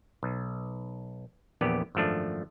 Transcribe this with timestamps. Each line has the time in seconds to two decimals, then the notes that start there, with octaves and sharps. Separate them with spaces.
0.23 B1
1.61 A#1 E2 B3 G4 D5
1.95 G#1 F#2 F3 A3 D4